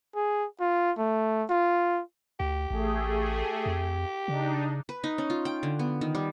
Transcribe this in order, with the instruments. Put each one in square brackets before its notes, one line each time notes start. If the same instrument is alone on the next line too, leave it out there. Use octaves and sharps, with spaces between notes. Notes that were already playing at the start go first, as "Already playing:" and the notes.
[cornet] G#4
F4
A3
F4
[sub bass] D2 [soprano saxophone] G4
[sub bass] A1 [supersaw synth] A3 G#4
[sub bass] F2
[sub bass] C#3 [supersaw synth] D4 D#4
[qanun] B4
D#4
C#4
F4
G5
D3
B3
D#3
G3